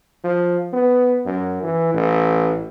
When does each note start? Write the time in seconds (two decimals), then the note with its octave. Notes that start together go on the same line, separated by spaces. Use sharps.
0.24 F3
0.73 B3
1.26 F#2
1.63 E3
1.94 A1